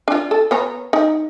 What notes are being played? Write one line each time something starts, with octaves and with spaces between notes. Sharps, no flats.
D4 F4
A4
B3 C#5 A#5
D#4